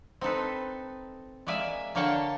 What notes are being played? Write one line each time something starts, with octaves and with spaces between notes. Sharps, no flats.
C4 D#4 A4 B4
G#3 A#3 D5 E5 G#5
D3 A#3 C#5 D5 G5 A5